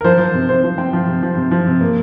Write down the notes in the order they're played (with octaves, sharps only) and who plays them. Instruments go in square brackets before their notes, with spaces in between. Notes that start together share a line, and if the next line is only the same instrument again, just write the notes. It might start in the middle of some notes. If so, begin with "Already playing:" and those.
[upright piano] A#4
F3 C5
F3
C3
C3 C5
F3
C4
F3
C3
F3
C3
F3
C3
A#3